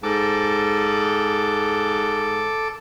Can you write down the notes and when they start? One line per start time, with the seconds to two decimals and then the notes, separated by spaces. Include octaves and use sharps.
0.03 G#2 A4 D6